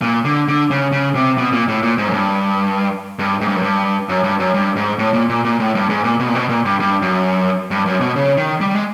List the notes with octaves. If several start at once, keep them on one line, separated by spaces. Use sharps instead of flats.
A#2
D3
D3
C#3
C#3
C3
B2
A#2
A2
A#2
G#2
F#2
G2
G2
G#2
G2
F#2
G2
F#2
G2
F#2
G2
G#2
A2
A#2
A#2
A#2
A2
G2
G#2
A#2
B2
A#2
B2
A#2
G2
G2
F#2
G2
F#2
B2
C#3
D#3
G3
G#3